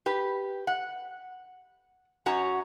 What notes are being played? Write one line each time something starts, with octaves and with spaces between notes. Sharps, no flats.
G4 B4
F#5
F#2 C#4 F#4 C#5 A#5